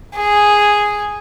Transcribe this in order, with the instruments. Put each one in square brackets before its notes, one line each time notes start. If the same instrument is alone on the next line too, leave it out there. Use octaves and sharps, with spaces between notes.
[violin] G#4